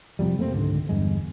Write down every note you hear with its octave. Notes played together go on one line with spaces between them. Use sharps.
F2 C3 F3 G3
F#2 A3 A#3 C4
C#2 G#2 D3
G1 E2 G2 G#3